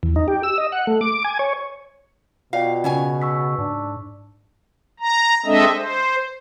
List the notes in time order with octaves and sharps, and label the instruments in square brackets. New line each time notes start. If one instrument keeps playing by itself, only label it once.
[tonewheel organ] E2
D#4
G4
E6
D#5
F#5
A3
D6
G#5
C#5
[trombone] B2 [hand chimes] F4 D5 G5 [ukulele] F5
[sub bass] C#3 [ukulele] C#4 C#5 G#5
[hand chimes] C#6 E6 B6
[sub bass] G#2 [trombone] D4
[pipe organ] A#5
G#3 C4 D4 A4 D#5 E5
C5